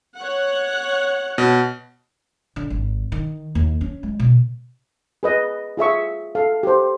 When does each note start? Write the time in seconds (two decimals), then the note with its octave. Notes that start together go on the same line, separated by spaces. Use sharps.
0.17 C#5 F#5
1.38 B2
2.56 D3
2.70 G#1
3.12 D#3
3.55 D#2
3.81 C#4
4.03 G#3
4.19 B2
5.23 G#4 B4 D#5
5.77 F4 G#4 E5 C#6
6.35 A4 F5
6.63 G4 C5